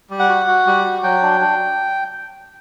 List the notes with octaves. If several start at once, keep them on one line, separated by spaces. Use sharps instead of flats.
G3
F#5
F#4
F#4
G3
F#4
F#3 G5
D4
D4